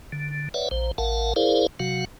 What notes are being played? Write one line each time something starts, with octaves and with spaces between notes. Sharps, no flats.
D3
B4 C#5 D5 E5 F#5
A#1 C5
A1 A#4 F5 F#5 A5
E4 G#4 A#4 C5 D5 F5
C3 F#3 F#4 F5 F#5